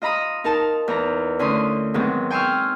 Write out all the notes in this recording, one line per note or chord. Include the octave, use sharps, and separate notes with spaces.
F4 D#5 A#5 B5 D#6
D#4 A#4 A5
E2 A#5
D2 D3 C#4 E4 C6 D#6
G#2 D#3 F#3 B3 C4
G5 G#5 C6 C#6 E6 F6